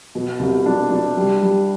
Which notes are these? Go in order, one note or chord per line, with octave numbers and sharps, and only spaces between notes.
B2
C2
D4
D4
G3
G3